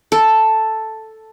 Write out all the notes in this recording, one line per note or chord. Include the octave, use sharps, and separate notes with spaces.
A4